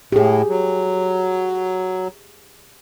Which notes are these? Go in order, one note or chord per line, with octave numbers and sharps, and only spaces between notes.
A2 G4 G#4
F#3